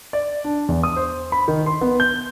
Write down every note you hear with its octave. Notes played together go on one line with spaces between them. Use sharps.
D5
D4
E2
D#6
C5
B5
D#3
C6
B3
G6